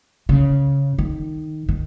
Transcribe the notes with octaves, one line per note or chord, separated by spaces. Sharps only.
C#3
D#3
D#3